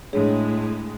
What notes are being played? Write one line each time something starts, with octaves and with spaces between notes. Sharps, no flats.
A2 G#3 D4 G#4 C#5